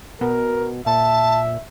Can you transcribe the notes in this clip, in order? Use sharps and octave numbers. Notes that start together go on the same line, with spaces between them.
B2 A#4
A#2 E5 A5